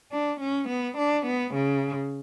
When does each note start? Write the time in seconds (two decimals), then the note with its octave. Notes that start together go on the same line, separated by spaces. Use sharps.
0.11 D4
0.40 C#4
0.69 B3
0.98 D4
1.26 B3
1.54 C#3